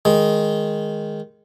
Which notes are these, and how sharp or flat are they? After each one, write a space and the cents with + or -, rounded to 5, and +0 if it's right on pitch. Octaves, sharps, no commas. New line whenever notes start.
D#3 +0 G#3 +0